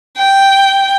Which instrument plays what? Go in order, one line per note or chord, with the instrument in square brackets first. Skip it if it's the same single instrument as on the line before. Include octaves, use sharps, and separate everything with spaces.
[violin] G5